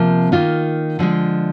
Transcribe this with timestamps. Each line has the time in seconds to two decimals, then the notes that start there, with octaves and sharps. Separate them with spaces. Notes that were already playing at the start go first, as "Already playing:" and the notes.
Already playing: C3 F3 A#3
0.32 D#3 A#3 F4
0.99 D3 F3 G#3